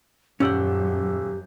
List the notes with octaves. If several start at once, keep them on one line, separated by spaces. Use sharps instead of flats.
D#1 F#2 C#4 G4 D5 F#5 E6 G6